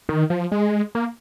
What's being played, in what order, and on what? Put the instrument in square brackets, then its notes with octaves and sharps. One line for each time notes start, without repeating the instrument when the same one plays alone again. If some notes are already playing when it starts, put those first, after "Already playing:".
[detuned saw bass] D#3
F3
G#3
A#3